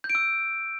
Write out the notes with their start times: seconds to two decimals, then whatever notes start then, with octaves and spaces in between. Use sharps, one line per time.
0.04 G6
0.10 D7
0.15 E6